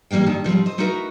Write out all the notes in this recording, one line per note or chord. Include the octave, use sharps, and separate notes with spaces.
E3 G3 A#3 F5 G5
G2 D#3 G3 A5
G#2 F3 G3 C4
C5 D#5
A3 D#4 E4 F#4 A#4 B4